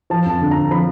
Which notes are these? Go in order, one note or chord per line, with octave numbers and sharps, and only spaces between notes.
F3 A5
F2 A5
D3
A#5
F2
F3 B5